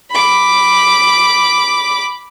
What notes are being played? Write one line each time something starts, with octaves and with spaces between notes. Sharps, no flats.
B5 D6